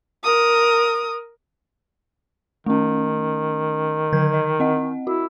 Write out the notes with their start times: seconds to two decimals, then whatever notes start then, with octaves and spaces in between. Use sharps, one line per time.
0.24 A#4 D#6
2.66 D#3 A3 C#4
4.13 D3 G6 G#6
4.34 D#5
4.60 C4 D#5 F#5
5.07 E4 F#4